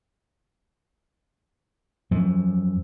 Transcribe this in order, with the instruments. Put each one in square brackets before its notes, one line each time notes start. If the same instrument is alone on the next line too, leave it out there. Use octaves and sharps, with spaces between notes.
[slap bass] F#2 F3